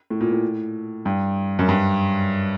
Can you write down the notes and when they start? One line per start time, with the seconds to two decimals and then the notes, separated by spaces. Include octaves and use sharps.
0.10 A2
0.21 A#2
0.32 A2
1.06 G2
1.59 F#2
1.69 G2